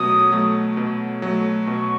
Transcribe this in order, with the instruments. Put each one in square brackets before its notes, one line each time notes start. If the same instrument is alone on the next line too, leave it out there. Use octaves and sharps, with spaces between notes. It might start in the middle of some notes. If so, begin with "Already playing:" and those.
Already playing: [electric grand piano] B2 F#3 A3 [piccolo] D#6
[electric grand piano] F#3 A3
B2
F#3 A3
[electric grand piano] B2 [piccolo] C#6